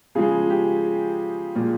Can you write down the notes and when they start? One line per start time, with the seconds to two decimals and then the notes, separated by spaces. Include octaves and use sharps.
0.15 C#3 F3 G#3 G#4
0.50 G4
1.55 A#2 F3 G#3